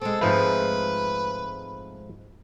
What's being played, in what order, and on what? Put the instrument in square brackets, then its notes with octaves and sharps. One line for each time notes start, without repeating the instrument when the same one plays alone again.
[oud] G#3 C4 [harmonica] A4
[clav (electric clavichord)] G#2 F3 A3 [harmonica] B4